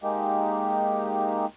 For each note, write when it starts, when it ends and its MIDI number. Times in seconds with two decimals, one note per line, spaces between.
0.03 1.46 56
0.03 1.46 58
0.03 1.46 63
0.03 1.46 67